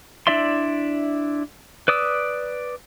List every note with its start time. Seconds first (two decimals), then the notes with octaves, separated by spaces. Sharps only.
0.27 D4 E4 D5 E5 C6
1.88 B4 D5 D#6 E6